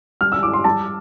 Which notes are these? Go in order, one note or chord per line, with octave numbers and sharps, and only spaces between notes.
G3 F6
E6
E4 D6
C6
G3 A5